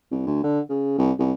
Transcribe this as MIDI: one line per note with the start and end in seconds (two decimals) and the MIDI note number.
0.11 0.26 36
0.26 0.42 38
0.44 0.60 50
0.69 0.93 49
0.98 1.12 36
1.19 1.32 36